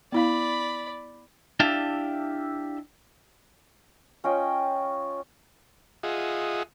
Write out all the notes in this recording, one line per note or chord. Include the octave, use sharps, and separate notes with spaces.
B3 E4 D5 F5 B5
D4 E4 G4 E5 F5 A5
C#4 F4 D#5 G5
F4 G#4 D#5 E5 F#5